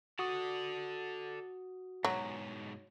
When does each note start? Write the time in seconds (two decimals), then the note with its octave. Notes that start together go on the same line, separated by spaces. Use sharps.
0.19 F#4 A4 D5 D#6
2.05 G#2 B2 F#3